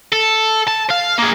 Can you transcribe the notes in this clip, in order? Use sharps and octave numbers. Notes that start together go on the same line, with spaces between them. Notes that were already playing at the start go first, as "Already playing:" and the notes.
A4
A5
F5
A#3 G#4